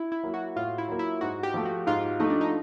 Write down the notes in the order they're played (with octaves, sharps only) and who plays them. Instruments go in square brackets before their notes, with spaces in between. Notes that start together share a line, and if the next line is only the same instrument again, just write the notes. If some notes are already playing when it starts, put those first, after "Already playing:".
Already playing: [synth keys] E4
E4
[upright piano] F#3 A#3
[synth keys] F#4
[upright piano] A2 [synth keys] F4
[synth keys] E4
[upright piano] F#3 A#3
[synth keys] E4
[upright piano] G#2 [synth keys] F#4
[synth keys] G4
[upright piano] F3 A3
[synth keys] F#4
[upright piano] G#2 [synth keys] F4
[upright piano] F3 A3 [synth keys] D#4
[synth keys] D4
D#4